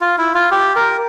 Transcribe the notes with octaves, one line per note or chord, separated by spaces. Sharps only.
F4
E4
F4
G4
A#4